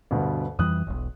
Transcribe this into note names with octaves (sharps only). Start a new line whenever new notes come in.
D2 G2 B2
F2 E3 G3 D#6 F#6
E1 B1